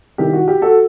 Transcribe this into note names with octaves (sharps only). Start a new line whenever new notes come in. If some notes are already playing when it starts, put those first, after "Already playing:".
C2 C3 D#3 G4
F#4
G4
F#4 A4